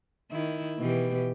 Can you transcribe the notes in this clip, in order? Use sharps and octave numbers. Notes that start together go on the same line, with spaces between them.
D#3 E4
B2 E3 G4